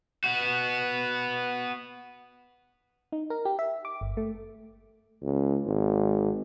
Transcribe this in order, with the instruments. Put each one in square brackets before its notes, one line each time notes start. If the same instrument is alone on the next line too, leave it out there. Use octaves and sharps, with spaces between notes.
[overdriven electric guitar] B3 F#4
[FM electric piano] D#4
A#4
G4
E5
D6
G1
A3
[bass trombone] C#2
G#1